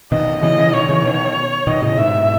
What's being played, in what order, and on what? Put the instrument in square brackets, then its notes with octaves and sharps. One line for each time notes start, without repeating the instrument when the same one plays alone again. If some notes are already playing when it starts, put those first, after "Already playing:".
[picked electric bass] B2 D#3 [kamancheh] D#5
[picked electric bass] C#3 E3 [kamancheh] D#5
[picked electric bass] C#3 E3
[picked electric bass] B2 D#3 [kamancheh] C#5
[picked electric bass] C#3 E3
B2 D#3
[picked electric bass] B2 D#3 [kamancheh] D#5
[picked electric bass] A2 C#3
[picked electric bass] G#2 B2 [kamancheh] E5